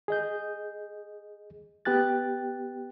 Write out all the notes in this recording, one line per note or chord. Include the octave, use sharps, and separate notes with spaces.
G#4 D#5 G6
B3 G4 G5 F#6 A6